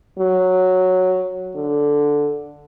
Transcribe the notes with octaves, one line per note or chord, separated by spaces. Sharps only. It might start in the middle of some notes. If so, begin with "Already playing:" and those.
F#3
D3